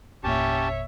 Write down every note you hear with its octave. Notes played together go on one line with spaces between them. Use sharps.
G1 E2 A#2 C#4 G4 C#5 E5 A5